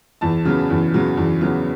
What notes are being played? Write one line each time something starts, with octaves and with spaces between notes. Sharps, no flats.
E2 A5
C#3 F#3 B3
E2
C#3 F#3 B3
E2
C#3 F#3 B3